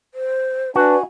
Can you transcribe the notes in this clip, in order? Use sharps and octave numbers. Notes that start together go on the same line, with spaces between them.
C5
D4 F#4 B4 G#5